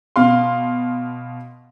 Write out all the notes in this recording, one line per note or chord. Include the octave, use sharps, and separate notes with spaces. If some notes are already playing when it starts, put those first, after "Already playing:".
B2 F5 C6